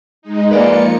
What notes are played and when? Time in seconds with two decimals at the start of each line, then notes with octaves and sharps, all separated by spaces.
0.22 G#3 D#4
0.51 F3 A#3 F4 B4 D5 G#5 C#7